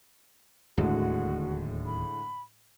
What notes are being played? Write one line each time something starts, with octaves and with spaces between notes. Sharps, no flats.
D1 D#2 A2 D3 G#3 F#4
B5